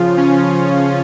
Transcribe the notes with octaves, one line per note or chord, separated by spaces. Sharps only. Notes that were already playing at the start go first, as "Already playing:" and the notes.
Already playing: C#3 F3 F4
C#4